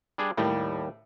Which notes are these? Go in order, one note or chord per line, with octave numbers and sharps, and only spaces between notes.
G3 D4 G#4
D#2 A2 G3